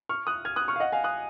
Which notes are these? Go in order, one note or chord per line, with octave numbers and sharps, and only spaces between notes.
C#6 F6
D#6 F#6
F6 G#6
D#6 F#6
C#6 F6
F5
D#5 F#5
F5 G#5
D#6 F#6